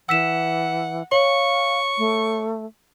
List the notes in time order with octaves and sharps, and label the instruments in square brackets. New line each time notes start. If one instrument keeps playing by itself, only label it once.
[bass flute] E3 [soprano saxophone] F#5 [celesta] E6 B6 E7
[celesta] C#5 [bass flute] F5 [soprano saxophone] C#6
[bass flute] A3